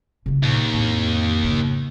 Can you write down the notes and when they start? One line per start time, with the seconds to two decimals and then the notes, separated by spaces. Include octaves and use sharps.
0.26 C#3 F4
0.43 D#2 A#2
0.73 F2 A2
1.44 G#2 C#3